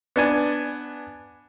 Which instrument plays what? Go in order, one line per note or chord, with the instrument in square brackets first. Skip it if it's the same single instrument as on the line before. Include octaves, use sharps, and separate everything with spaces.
[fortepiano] B3 D4 G#5